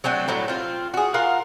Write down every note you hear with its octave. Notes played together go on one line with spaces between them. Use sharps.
F#3 A3 C4 D4
A2 F#3 G3 A3
C4 F4
F#4 G#4
F4 A#4 F5 F#5